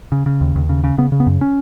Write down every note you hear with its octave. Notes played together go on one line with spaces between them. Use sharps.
C#3
C#3
D#2
D#2
C#3
C#3
C#3 B3
C#3
B3
F#2
C#4